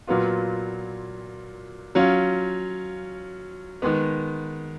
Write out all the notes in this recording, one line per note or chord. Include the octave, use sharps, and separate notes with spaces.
A#2 F#3 B3 F4
F#3 C#4 F4
D#3 G#3 B3